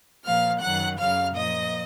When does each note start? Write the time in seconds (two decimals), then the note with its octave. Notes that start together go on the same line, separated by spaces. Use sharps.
0.24 A#2 F3 F5 F6
0.62 F#2 D#3 F#3 F#5 F#6
0.99 F#2 C#3 F#3 F5 F6
1.36 A#2 F3 D#5 D#6